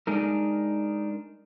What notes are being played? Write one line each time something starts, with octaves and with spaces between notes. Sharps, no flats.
G#3 D4 D#4 A#4